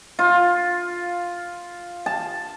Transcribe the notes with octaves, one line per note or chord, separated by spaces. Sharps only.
F4
A5